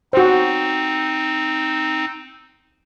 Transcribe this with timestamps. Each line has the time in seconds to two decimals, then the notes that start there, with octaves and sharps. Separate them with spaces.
0.13 C4 D#4 F#4 C5